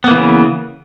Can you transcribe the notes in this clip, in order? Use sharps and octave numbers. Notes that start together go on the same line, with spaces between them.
C#3 E3 A#3 B3